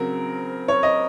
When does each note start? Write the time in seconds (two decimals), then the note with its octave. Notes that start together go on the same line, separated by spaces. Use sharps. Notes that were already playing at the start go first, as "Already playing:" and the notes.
Already playing: C#3 F#3 C4 A#4
0.68 C#5
0.83 D#5